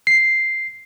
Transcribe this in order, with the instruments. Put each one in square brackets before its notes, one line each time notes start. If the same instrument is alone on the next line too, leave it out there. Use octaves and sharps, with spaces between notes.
[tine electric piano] C7